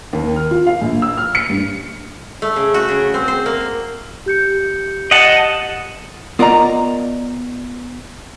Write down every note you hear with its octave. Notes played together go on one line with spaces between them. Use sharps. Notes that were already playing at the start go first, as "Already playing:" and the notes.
D#2
F6
F4
F5
A#1
E6
F6
C#7
G2
A3
C#3
F#4
C#3
C4
C5
A#3
G4 G6 C#7
D#5 F#5 A5
B3 F4 A#4 D5 D#5 A#5